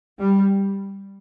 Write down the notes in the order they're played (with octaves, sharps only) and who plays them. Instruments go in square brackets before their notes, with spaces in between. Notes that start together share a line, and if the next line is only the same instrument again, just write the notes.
[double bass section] G3